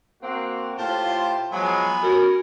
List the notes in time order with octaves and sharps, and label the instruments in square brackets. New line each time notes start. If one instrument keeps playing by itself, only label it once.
[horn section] A#3 C4 F#4
[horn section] A2 F4 [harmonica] G4 C5 A5
[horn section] F3 F#3 G#3 [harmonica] B3 G#5 B5
[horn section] C#4 A#4 C#5 [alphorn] F#4